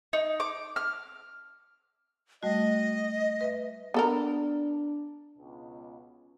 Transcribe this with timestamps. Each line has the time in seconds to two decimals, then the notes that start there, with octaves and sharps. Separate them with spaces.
0.13 D#4
0.40 D6
0.76 F6
2.43 G3 A3 F#4 D#5
3.41 B4 E5
3.94 B3 D4 A4 A#4
5.38 C#2 B2